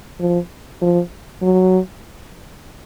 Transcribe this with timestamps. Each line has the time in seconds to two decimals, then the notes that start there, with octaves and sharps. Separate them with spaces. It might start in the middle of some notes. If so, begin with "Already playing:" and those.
0.20 F3
0.82 F3
1.42 F#3